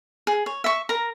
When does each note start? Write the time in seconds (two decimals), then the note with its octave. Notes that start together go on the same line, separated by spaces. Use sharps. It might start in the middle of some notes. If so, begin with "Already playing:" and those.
0.27 G#4
0.46 C#5
0.64 E5 C#6
0.89 A#4 A#5